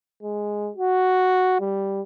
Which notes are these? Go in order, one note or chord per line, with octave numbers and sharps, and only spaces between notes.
G#3
F#4
G3